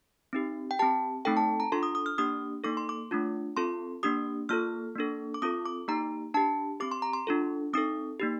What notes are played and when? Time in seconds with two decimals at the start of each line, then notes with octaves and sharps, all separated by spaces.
0.33 C4 D#4 G4
0.71 G5
0.79 C4 G4 A5
1.25 A3 C4 D#4 A4 G5
1.37 A5
1.60 A#5
1.72 D4 F4 A4 C6
1.83 D#6
1.95 D#6
2.06 F6
2.18 A#3 D4 G4 D#6
2.64 A#3 D#4 A4 D6
2.77 C6
2.89 D6
3.11 A3 D4 F4
3.57 C4 F4 A4 C6
4.03 A#3 D4 G4 D#6
4.49 A#3 F4 A4 F6
4.95 A#3 D4 A4
5.34 D6
5.42 C4 F4 A4 D#6
5.65 D6
5.88 A#3 D#4 G4 A#5
6.34 D4 G4 A5
6.80 C4 G4 D6
6.91 C6
7.02 A#5
7.13 C6
7.27 D4 F4 A4
7.73 C4 D#4 A4 D#6
8.20 A#3 D#4 G4